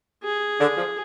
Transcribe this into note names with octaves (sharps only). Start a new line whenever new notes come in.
G#4
D3
F3